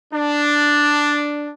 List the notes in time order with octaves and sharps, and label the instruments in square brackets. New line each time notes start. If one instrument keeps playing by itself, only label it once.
[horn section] D4